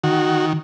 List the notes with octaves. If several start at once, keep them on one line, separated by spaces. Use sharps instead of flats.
D#3 F#4